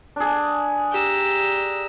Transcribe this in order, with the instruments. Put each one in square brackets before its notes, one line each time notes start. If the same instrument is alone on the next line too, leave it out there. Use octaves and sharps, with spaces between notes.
[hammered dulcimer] D4 G#4
[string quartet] G4 A#5 E6